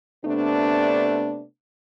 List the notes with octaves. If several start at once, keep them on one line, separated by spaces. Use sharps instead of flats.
C3 A3 B3 D4